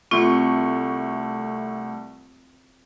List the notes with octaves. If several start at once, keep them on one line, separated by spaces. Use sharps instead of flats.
C2 A3 C4 F4 C#6